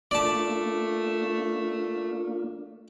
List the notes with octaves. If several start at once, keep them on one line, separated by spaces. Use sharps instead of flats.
A3 A#3 D4 F4 D5 A5